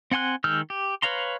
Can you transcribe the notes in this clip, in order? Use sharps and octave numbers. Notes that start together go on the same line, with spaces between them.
C4 F#5 G#5 C6 F#6
D#3 G#3 E6 F6 G6
G4
B4 C#5 F5 A#5 C6